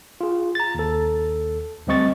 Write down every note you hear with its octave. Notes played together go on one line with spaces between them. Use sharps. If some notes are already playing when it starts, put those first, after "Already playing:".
F4 G#4
A#5 A6
D#2 A4
D2 G3 C4 D#5 C#6 A6